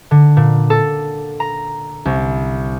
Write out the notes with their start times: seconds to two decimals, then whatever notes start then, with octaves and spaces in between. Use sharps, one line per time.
0.11 D3
0.37 A#2
0.70 A4
1.40 A#5
2.05 C2